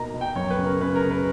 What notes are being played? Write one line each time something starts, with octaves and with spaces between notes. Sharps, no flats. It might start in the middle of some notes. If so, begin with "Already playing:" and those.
Already playing: B2 A#3 D#4 A#5
B2
G5
F#2 C#5
B4
C#3
A#4
C#3 B4
A#4
C#3
B4